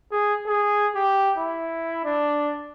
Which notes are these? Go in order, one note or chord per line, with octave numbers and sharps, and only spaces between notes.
G#4
G#4
G4
E4
D4